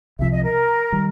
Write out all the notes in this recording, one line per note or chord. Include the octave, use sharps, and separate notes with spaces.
C2 C3 F3 E5
D#5
A#4
D#3 G3